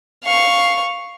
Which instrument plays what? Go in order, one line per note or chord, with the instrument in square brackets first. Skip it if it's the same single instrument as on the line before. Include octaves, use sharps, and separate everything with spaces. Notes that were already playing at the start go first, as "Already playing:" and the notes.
[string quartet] F5 C#6